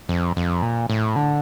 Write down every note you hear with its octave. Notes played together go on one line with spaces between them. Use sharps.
F2
F2
A#2
A2
D3